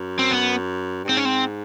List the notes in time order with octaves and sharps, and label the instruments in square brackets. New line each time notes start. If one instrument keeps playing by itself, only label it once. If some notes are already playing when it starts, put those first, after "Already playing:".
Already playing: [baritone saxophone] F#2
[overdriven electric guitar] C4
B3
[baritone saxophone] G2
[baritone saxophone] G#2 [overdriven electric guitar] C4
[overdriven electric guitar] C#4
C4